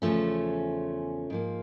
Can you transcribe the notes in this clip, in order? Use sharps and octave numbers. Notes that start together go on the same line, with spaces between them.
E2 C#3 F3 A3 C#4
G#2 F3 A#3